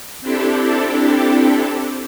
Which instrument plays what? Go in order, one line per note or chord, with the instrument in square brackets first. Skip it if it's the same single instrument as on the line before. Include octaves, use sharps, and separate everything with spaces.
[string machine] C4 D4 E4 G4 A4